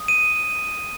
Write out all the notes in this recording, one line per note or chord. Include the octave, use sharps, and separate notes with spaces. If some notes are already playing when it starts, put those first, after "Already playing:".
Already playing: D#6
D#7